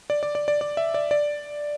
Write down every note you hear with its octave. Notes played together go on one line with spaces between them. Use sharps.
D5
D5
D5
D5
D5
E5
D5
D5